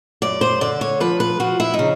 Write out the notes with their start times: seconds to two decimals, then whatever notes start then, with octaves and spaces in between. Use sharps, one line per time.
0.22 F#2 D5
0.41 C5
0.61 D3 D5
0.81 C#5
1.00 F3 B4
1.20 B4
1.40 F3 F#4
1.60 E4
1.74 D#4
1.79 C#3